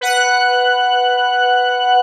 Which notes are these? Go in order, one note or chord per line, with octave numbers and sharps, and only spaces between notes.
B4 F#5 F#6